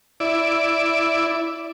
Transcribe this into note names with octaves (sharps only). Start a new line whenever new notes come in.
E4 D5